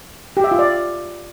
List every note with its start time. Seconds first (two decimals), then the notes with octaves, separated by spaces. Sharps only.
0.37 G4
0.44 E5
0.51 F4
0.59 D5